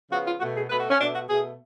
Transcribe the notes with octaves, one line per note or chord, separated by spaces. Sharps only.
C#3 F3 B3 F#4
F4
B2 A3 F#4
G#4
B2 A3 B4
F#4
C#4
B2 A3 D4
F#4
B2 A3 G#4